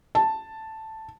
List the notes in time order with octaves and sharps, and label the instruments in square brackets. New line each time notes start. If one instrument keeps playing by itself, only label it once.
[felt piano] A5